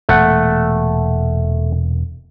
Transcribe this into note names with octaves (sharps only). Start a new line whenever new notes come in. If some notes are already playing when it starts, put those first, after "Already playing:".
E1 A#2 A3 F#5